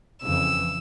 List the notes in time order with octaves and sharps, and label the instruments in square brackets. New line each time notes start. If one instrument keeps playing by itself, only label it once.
[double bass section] F2 C#3 E3 [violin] E6